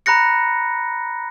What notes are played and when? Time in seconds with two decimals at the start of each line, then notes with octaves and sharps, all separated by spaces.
0.06 A#5 B5 F#6 A#6 C#7